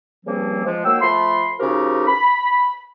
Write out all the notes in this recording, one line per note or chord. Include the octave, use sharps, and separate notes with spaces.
G2 C#3 F3 G3 A#3 C4
F3 G#3
D#3 F#3 A#3 G5 E6
F3 A3 B5 C6
C#3 F3 D#4 F#4 G4 A#4
B5